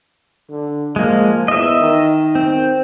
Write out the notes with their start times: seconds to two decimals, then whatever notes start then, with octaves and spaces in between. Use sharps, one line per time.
0.50 D3
0.96 F3 G#3 A#3
1.48 E2 D#5 E5
1.80 D#3
2.35 C4